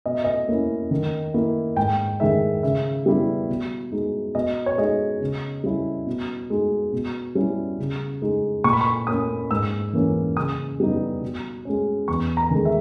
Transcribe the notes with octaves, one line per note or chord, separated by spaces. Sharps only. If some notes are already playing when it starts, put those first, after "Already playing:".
B2 D#5
E5
D#5
A#3 C#4 E4
D#3
A#3 E4
G#2 G5
D#3 G#3 D#4 E5
C#3 E5
G3 B3 E4
B2
G#3 D#4
B2 D#5
C#5
G#3 D#4 D#5
C#3
G3 C#4 E4
B2
G#3 D#4
B2
G3 C#4 E4
C#3
G#3 D#4
A#2 C#6
B5
C#6
A#3 C#4 D#6
G#2 E6
E3 A#3 C#4
C#3 D#6
G3 B3 D#4
B2
G#3 C#4
E2 C#6
A#5
D#3 G#3
E5